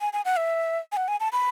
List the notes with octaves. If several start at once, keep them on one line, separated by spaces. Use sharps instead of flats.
G#5
G#5
F#5
E5
G#5
F#5
G#5
A5
B5